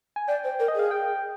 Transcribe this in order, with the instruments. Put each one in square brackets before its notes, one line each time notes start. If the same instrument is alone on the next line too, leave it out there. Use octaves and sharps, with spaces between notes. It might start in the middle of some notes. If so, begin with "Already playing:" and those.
[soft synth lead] G#5
[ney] D5 [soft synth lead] G5
[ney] C5
A#4
[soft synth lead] D#5
[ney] G#4 [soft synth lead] F5
[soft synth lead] G5